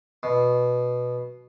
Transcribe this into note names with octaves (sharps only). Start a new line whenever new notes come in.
B2